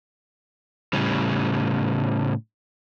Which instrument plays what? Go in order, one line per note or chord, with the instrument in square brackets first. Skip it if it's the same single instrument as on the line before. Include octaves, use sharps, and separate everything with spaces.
[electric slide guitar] A2 C#3 G3